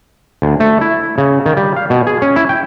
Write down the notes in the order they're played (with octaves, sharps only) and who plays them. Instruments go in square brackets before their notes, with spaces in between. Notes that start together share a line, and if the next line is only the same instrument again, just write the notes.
[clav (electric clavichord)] D2
A3
E4
C#3
D#3
G3
F5
B2
G#4
C#4
E4
G5